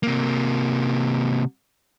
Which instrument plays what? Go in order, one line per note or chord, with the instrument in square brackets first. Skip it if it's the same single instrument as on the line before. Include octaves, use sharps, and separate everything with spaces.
[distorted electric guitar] C3 A#3